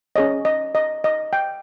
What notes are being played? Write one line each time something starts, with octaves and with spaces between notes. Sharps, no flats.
C#4 G#4 C#5 D#5
D#5
D#5
D#5
G5